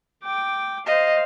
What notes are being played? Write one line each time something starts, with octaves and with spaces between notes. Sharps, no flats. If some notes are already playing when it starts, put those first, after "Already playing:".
G5 D6
C5 D#5 F5